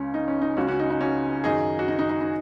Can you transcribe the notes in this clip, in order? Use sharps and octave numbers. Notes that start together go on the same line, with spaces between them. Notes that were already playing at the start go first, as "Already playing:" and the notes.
Already playing: C#2 C#3 C#4
D#4
C#4
D#4
C#2 C#3 C#4 F#4
C#4 F#4
D#4
D#4
C#4 F#4
F#2 D#3 D#4 G#4
F#4
D#4
D#4
D#4
D#4